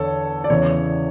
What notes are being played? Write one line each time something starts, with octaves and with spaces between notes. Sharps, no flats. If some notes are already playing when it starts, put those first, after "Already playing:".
Already playing: E2 D3 A4 C#5
D5
E2 C#3 E3 C#5